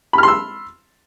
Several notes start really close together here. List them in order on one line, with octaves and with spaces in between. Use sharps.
B5 F6 C6 E6